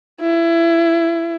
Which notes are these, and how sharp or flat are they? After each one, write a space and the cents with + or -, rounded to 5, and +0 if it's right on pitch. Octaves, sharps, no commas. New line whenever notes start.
E4 +25